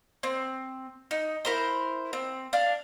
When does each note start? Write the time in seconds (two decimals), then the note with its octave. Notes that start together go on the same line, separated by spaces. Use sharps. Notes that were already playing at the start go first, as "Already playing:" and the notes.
0.23 C4
1.11 D#4
1.45 E4 A#4 C5
2.13 C4
2.53 D4 F5